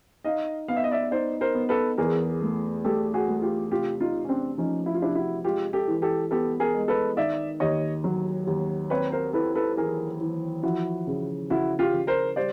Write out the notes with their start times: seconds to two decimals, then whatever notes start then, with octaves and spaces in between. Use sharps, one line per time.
0.24 D#4 D#5 F5
0.68 B3 F5
0.76 E5
0.84 D#5
0.91 D5 E5
1.11 D#4 C5 D5
1.41 A#4 C5
1.55 B3
1.69 A4 B4
1.98 E2 G#4 A#4
2.41 A3
2.84 A3 G4 A4
3.14 F#4 G#4
3.28 A3
3.42 F4 G4
3.71 C3 F4 G4
4.00 D#4 F4
4.14 C3
4.25 C#4
4.29 C4 D4
4.58 F3 C#4 D#4
4.86 E4
4.94 F4
5.01 C3 D4 E4
5.15 E4 F#4
5.44 G#3 F4 G4
5.73 G4 A4
5.88 E3
6.02 G4 A4
6.31 B3 G4 A4
6.60 G#4 A#4
6.74 G#3
6.88 A4 B4
7.17 D#3 D5 E5
7.60 D#2 C#5 D#5
8.04 F#3
8.47 D#2
8.90 C4 B4 C#5
9.12 A#4 C5
9.33 E4 A4 B4
9.55 A4 B4
9.77 E3 G#4 A#4
10.21 E3
10.63 F3 E4 F#4
11.07 C#3
11.50 C#3 E4 F#4
11.79 F4 G4
11.93 C#3
12.07 A#4 C5
12.36 G3 C5 D5